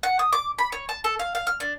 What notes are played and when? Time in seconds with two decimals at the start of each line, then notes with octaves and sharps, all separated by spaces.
0.03 F#5
0.19 D#6
0.33 D6
0.58 B5
0.72 C#5
0.89 A5
1.04 A4
1.19 F5
1.35 F5
1.47 F6
1.60 D4